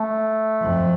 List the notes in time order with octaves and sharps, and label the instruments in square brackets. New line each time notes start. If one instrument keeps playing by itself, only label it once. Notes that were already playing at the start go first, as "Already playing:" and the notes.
Already playing: [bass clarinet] A3
[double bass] F2